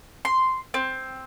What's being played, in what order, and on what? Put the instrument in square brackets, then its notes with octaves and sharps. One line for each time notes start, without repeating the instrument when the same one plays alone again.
[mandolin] C6
C4